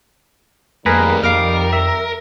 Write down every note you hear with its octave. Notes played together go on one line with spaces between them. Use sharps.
F2 D#3 G3 A3 A#3 G#4 A#4 B4
F2 A#4 F5 D6 F6
E5